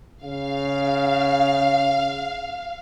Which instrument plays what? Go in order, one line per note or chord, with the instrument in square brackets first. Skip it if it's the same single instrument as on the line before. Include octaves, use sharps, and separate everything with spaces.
[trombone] C#3 [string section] F5